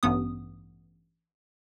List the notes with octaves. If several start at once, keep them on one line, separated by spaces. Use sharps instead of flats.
A1 G2 B3 D#6